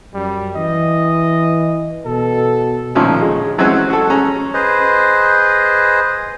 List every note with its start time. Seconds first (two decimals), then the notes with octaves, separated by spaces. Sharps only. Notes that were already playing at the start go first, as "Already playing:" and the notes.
0.14 F#2 G3
0.56 E3 D#5
2.05 B2 A4
2.95 A#2 D3 D#3 F3 A3 C#4
3.22 G#3
3.58 E3 F#3 G#3 C4 C#4 F#4
3.90 F#4 A4
4.10 C#4 G#4 A#5
4.54 G#4 B4 C5 D#5